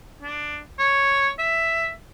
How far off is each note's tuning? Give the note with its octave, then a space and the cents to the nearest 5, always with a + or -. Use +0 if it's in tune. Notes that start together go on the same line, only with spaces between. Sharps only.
D4 +10
C#5 -5
E5 +5